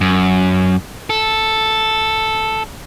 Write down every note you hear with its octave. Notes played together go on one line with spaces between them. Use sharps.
F#2
A4